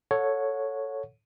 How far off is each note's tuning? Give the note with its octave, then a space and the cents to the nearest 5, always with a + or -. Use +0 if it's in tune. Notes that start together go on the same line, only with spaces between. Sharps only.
A4 +0 C#5 +0 F#5 -30